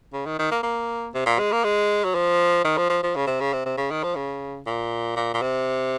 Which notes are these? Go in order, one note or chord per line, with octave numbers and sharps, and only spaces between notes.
C#3
D#3
D#3
A#3
A#3
C3
A#2
G#3
A#3
G#3
F#3
F3
D#3
F3
F3
F3
C#3
C3
C#3
C3
C3
C#3
D#3
F3
C#3
A#2
A#2
A#2
C3